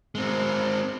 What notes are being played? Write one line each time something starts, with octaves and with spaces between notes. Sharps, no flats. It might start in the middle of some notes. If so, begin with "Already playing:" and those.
G#3 C4